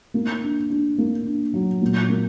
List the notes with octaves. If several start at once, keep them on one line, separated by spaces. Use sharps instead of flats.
A#3
D4
D4
A#3
D4
F#3
A#2
A#3